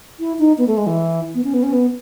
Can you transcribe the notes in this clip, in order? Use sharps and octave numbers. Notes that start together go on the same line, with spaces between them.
E4
D#4
B3
A3
G#3
E3
B3
C#4
B3
C#4
B3